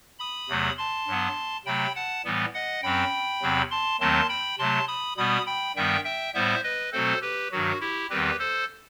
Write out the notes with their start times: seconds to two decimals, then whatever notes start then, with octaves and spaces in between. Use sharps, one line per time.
0.19 B5 D#6
0.49 E2 C3 F#3 A3
0.78 A5 C6
1.07 G2 F#3 B3
1.66 C3 F#3 A3 G5 B5
1.95 F#5 A5
2.25 A2 E3 G3 B3
2.54 D#5 F#5
2.83 F#2 F#3 C4 G5 B5
3.42 E2 C3 F#3 C4
3.71 A5 C6
4.00 D#2 D#3 F#3 A3 C4 A5 C6
4.29 G5 B5
4.58 C3 F#3 A3 A5 C6
4.88 B5 D#6
5.17 B2 G3 B3 B5 D#6
5.46 G5 B5
5.76 G2 D#3 G3 B3 E5 G5
6.04 E5 G5
6.34 A2 G3 B3 C5 E5
6.64 B4 D#5
6.92 B2 F#3 A3 C4 A4 C5
7.21 G4 B4
7.51 G2 D#3 F#3 F#4
7.80 E4 G4
8.10 E2 D#3 G3 C4 G4 B4
8.39 A4 C5